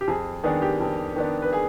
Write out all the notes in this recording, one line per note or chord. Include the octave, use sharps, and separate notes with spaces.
G4
F2 G#4
D#3 B3 D4 G#4
G4
F2
D#3 B3 D4
B4
G#4